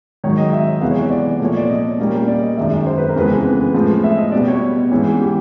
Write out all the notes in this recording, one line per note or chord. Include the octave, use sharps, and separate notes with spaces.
G#2 D#3 F#3 C#5
D#5
E5
C3 E3 G#3 B3 F5
C#5
C#5
D5
A#2 F3 A3 C#5
D5
D#5
A#2 G3 A#3 C#4
D5
D#5
F#2 D#3 G#3 E5
C5
B4
A#4
F2 C#3 E3 G#3 B3 B4
B4
A2 F3 G#3
E5
D#5
B2 G3 B3 D5
C#5
G#2 E3 G#3 C#4
G4